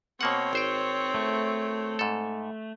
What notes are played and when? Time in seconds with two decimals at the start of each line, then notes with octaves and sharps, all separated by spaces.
0.21 B2 A#3 C4 C#5 F#5
0.53 G#1 C5 G5
1.14 A3
1.99 G#2 A4